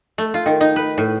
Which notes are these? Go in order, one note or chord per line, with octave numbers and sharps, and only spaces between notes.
A3
F4
D#3
D#4
B4
A2